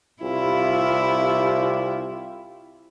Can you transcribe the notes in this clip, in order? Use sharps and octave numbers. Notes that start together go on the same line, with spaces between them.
C2 E4 F4 G4